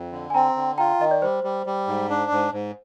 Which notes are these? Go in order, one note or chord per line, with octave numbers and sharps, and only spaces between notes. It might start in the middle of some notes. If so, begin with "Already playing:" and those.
Already playing: F2
D3
G#5
C4 G5 A#5
D3
F4 G5 A#5
D#3 D#5
D5
G3 C5
G3
G3
G#2
D4
G#2
G#2